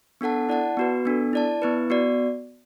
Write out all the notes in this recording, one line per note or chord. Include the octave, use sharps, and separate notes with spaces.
B3 D4 A4 F#5 A5
E4 D5 F#5 A5
B3 F#4 B4
B3 D4 A4
E4 D5 A5
B3 E4 B4
B3 F#4 D5